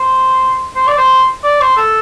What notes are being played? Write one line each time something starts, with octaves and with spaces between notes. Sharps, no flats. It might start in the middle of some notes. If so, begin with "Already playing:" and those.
Already playing: C5
C5
D5
C5
D5
C5
A4